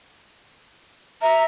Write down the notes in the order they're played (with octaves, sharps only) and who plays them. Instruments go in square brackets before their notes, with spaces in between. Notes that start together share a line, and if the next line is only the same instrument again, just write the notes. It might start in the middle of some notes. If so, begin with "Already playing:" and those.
[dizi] E5 [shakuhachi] A#5